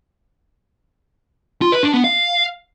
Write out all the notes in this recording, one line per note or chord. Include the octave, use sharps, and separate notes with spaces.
F4
B4
D4
B3
F5